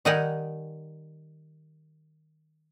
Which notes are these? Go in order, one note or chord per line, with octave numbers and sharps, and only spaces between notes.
D#3 G3 D#4 G4 F#5 G#5